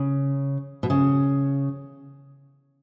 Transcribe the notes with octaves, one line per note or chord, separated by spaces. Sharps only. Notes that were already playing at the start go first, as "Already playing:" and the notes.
Already playing: C#3
B2
C#3